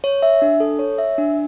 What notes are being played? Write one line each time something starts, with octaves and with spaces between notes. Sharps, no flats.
C#5
E5
D4
A4
C#5
E5
D4